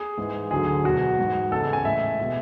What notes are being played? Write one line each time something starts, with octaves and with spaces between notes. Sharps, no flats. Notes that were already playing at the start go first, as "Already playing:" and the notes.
Already playing: G#4
G#2 E3 G#3
D2 D3 F#3 G#4
E2 B2 F#3 F#4
G#2 G#3
E2 C#3 G#3 A4
G#5
A2 G#3 E5
B2 G#3